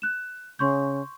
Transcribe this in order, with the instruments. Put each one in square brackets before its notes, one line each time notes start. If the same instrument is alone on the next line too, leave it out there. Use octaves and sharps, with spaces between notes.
[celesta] F#6 E7
[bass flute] C#3 [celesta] C6 C#6 G6